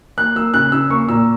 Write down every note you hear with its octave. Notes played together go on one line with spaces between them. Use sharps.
A#3 F#6
A#3 E6
C#3 F#6
C#3 E6
A#3 C#6
A#2 E6